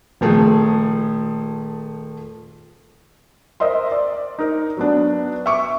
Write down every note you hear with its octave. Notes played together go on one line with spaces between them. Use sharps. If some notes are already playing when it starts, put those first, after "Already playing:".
D#1 F3 A3 G#4
A#4 C5 D#5 E5 C6
D5
D#4 A#4
F#3 B3 D4
E5 C#6 D6